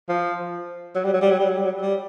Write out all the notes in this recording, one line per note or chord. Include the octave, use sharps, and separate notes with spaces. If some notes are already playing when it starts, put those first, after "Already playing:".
F3
F#3
G3
F#3
G3
F#3
G3
F#3
G3
F#3
G3